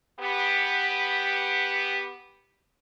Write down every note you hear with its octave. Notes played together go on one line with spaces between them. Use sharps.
B3 G4